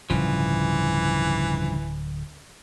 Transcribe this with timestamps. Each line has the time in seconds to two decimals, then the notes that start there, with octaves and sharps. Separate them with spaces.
0.10 D1 G2 C#3 E3 F3